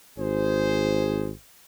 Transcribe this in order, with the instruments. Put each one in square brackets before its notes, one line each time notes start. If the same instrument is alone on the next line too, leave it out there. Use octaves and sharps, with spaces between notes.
[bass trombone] G#1 [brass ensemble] G#4 C5